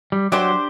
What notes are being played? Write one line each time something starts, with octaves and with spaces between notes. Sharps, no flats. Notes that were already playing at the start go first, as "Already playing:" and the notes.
G3
F#3 D4 G4 C5